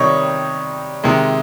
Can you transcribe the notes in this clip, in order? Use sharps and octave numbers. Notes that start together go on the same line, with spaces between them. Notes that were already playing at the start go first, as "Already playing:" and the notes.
Already playing: C3 D#3 G3 C#5 D#5
C3 D#3 G#3